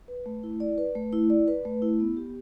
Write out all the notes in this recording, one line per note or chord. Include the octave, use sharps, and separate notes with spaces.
B4
A3
E4
D5
B4
A3
E4
D5
B4
A3
E4
B3
G4